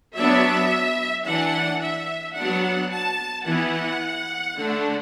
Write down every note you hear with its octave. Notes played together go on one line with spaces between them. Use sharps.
F#3 B3 D4 E5
E3 D4 F#5
E5
F#3 B3 D4 F#5
A5
E3 B3 E4 F#5
D3 A3 D4